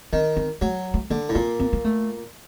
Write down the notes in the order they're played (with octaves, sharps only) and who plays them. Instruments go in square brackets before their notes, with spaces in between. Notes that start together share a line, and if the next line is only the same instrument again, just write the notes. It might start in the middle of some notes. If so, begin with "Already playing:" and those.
[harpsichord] D#3 [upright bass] C4
[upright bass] C4
[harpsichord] F#3 [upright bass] A3
[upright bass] A3
[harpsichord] D3 [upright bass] A#3
[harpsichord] A2
[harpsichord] A#2 [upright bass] C4
[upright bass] C4
A#3
A3